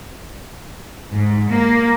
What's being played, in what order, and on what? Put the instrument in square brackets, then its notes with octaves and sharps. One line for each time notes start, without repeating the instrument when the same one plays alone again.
[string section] G#2
A#3